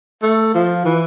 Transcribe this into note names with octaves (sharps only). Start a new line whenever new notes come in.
A3
F3
E3